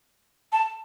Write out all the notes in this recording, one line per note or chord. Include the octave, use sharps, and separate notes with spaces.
A5